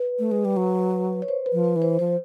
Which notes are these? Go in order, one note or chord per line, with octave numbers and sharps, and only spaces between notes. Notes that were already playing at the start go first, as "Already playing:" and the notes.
Already playing: B4
A3
G#3
G3
F#3
C#5
C5
B4
F3
B4
E3
C5
F3 C5